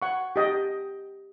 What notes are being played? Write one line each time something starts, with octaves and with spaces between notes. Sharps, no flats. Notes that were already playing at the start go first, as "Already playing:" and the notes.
F#5 C#6
G4 D#5 G5